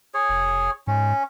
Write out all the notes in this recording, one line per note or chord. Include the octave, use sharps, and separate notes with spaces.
G#4 C#5
F1
G#2 C#4